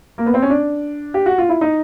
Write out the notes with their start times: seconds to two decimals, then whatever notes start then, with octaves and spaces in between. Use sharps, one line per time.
0.18 A#3
0.26 B3
0.34 C4
0.42 C#4
0.50 D4
1.14 G4
1.26 F#4
1.38 F4
1.49 E4
1.61 D#4